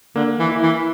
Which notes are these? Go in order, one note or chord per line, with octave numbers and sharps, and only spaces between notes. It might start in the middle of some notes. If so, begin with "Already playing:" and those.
D3 A#3
E3
E4
E3